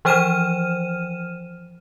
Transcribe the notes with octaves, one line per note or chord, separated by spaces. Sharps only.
E3 F3 C5 F6 D#7 E7